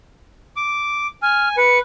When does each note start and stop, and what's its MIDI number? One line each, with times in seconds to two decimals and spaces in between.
0.57 1.07 86
1.22 1.56 80
1.22 1.49 89
1.57 1.79 71
1.57 1.78 97